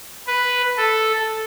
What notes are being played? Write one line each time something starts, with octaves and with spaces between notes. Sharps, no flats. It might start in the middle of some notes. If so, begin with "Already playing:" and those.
B4
A4